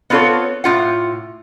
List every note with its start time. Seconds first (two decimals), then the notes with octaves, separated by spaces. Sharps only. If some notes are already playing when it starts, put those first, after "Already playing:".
0.10 B3 C4 F4 A4 C#5
0.64 A2 F4 F#5